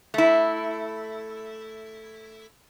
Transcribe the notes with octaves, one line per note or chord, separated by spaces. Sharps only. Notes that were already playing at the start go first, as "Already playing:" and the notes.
A3 E4